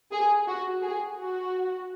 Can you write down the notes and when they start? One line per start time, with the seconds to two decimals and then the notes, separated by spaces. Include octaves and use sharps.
0.11 G#4
0.47 F#4
0.82 G#4
1.19 F#4